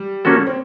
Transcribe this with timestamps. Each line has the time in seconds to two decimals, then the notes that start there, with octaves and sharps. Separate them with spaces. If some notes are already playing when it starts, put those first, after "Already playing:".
Already playing: G3
0.25 A#3 C#4 F#4 A4
0.47 C4